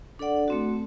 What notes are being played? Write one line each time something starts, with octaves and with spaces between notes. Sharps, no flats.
D4 A4 D5 F#5
A3 C4 F#4